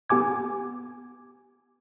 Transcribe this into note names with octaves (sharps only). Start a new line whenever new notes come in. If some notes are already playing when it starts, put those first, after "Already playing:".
B3 G4 G#5 D6 G#6